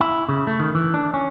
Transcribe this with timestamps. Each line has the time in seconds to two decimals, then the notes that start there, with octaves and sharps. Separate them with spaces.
0.01 E4
0.29 C#3
0.47 A3
0.60 D#3
0.75 E3
0.94 D4
1.14 C#4